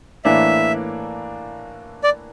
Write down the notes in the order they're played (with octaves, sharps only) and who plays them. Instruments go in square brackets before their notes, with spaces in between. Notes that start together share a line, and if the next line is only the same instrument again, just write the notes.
[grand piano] A2 E3 A#3 D4 [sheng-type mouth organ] E5
[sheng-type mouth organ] D5